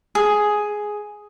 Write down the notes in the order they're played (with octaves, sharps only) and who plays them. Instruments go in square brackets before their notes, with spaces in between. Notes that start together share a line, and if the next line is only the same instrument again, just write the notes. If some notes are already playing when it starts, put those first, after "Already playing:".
[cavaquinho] G#4